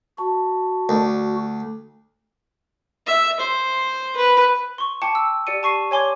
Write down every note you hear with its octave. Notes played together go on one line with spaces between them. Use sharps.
F#4 A5
D2
E5
C5
B4
C6 C#6
G5 A5 D6 C#7
E6
G4 D5 C#7 D#7
A5 C#6 C7 D#7
C#5 G#5 C6 D6 G#6